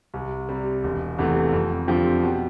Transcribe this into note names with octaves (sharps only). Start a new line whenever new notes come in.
C2
C3 G3
E1
E2 C3 E3 A3
F2
D3 F3 C4 G4
B2